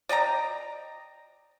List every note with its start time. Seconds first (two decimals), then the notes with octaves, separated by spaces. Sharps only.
0.09 D5 D#5 G5 A#5